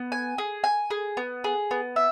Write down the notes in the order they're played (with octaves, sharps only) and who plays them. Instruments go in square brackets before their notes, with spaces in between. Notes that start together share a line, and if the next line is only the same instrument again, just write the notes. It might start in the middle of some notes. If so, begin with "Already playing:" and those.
Already playing: [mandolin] B3
G#5
G#4
G#5
G#4
B3
G#4
B3
E5